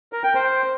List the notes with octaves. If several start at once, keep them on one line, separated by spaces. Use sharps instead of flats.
A#4
G5
C5